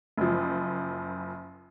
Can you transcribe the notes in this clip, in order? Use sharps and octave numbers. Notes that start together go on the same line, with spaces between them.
F#1 F3